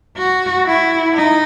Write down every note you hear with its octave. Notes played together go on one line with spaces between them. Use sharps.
F#4
E4
D#4